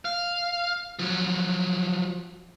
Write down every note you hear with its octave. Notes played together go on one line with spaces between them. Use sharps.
F5
F3 F#3